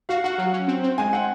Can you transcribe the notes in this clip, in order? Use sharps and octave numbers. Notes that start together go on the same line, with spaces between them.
F#4 F5
F#4 F#5
F#3
C#4
C4
C4
G#3 G#5
C4 F#5